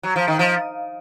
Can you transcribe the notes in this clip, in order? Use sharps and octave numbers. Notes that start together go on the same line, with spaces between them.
F#3
F3
D#3
F3